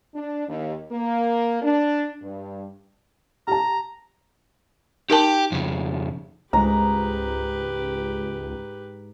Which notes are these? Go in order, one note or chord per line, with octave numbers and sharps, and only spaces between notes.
D4
D#2
A#3
D4
G2
G4 A5 A#5
D#4 G4 A#4 G5 A5
F2 C#3
C#2 G#2 G#3 G4 B4 A#5